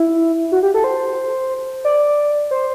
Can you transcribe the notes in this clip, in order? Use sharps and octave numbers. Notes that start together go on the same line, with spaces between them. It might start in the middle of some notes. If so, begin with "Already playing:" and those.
Already playing: E4
F#4
G4
A4
C5
D5
C5